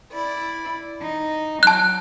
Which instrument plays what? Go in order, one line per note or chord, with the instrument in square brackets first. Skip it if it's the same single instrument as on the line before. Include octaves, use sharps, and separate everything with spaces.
[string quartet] E4 D5
D#4
[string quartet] F#3 [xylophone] A5 F#6